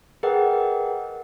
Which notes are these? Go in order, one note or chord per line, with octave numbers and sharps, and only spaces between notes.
G#4 A#4 B4 D#5 F#5 G5